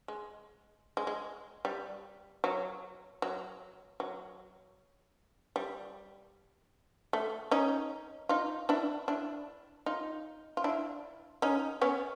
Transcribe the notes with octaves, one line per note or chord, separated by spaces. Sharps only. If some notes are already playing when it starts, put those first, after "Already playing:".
G#3
G#3
G#3
G3
F#3
F#3
F#3
G3
A3
C#4 D#4
D#4 F4
D4 E4
D4 E4
D#4 F4
F4
D4 E4
C#4 D#4
B3 C#4